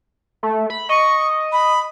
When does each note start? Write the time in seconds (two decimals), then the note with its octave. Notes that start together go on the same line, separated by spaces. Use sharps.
0.43 A3
0.70 B5
0.89 D#5 C#6
1.52 B5